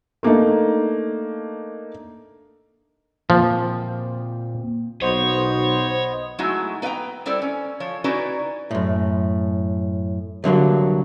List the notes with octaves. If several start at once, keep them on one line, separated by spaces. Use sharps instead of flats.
A3 A#3 D4 D#4
A#2 F3 A#3 C4
B1 B3 C5 C#5 D#5
F#3 G#3 A3 D#4 E4 F#4
B3 B4 E5 F5 G5 A#5
G3 E4 A4 C5 D5
C#4
F3 C#5
C#4 D#4 E4 F#4 B4 D5
F#2 A2
C2 D3 F#3 A#3